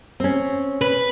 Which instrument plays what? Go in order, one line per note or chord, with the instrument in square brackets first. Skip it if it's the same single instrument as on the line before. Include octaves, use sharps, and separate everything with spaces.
[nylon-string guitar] C4 C#4
[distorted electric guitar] B4